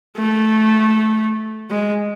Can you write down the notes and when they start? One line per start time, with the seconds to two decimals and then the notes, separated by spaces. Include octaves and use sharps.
0.17 A3
1.70 G#3